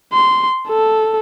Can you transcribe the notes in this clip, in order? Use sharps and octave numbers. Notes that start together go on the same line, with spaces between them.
C6
A4